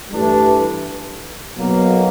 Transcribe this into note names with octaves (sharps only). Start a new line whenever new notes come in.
G2 E3 A3 D4
B1 B2 F#3 A#3